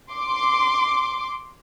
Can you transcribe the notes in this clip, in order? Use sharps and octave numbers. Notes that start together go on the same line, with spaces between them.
C6 D6